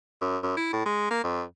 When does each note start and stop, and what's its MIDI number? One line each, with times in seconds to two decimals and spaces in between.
0.21 0.37 42
0.43 0.52 42
0.57 0.72 64
0.73 0.83 45
0.86 1.07 56
1.10 1.20 58
1.24 1.43 41